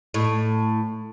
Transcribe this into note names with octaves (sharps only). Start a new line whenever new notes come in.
A2